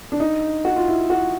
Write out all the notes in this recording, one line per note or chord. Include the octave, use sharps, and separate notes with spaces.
D4
D#4
F#4
F4
E4
F#4